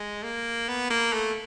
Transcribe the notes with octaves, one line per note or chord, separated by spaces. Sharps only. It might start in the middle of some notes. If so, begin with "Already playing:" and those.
Already playing: G#3
A#3
B3
A#3
A3